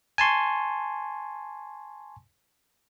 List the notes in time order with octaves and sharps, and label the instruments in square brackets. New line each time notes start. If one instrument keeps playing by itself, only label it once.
[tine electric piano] G#5 A5 C6 C#6